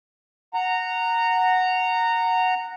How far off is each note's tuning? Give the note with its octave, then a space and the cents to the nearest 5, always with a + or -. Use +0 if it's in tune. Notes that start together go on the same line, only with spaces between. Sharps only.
F#5 -5 A#5 -15